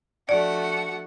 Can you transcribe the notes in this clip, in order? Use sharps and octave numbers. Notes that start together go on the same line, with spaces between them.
F3 A3 D4 F#4 D5 F#5